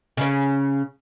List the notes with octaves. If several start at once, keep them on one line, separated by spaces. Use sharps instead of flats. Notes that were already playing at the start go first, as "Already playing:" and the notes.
C#3 C#4